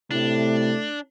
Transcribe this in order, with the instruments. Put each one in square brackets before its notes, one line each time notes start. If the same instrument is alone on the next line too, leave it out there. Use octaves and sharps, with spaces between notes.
[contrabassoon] A2 [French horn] C3 [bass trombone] A3 [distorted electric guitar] D4